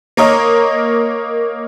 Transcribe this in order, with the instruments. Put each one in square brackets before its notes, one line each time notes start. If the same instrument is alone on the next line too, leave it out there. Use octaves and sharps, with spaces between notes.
[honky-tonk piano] A#3 A#4 C#5 D#5